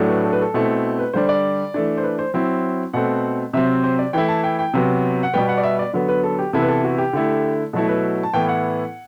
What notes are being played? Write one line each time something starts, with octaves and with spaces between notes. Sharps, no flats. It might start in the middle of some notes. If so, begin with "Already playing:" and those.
Already playing: A2 F#3 A3 D4
B4
A4
B4
A4
B2 A3 C4 E4
B4
D3 G3 D4 C5
D5
E3 A3 D4
C5
B4
C5
F#3 C4 E4
B2 A3 C4 F#5
C3 F#3 C4 E5
C5
D5
E3 A3 E4 G5
A5
G5
G5
C3 F#3 B3
F#5
B2 G3 B3 G5
F#5
D5
E5
D5
D3 F#3 B3
B4
A4
G4
C3 E3 B3 E4 A4
B4
A4
F#4
G4
D3 A3 E4
B2 F#3 A3 E4 A4
B4
A5
A2 E3 B3 E4 G5
F#5